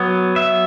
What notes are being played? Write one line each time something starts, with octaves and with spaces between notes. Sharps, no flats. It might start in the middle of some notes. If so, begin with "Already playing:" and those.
Already playing: F#3 B3
E5